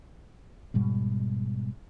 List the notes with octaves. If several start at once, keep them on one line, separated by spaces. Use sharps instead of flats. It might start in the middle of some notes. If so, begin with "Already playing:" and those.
G#2 B2 G3 G#3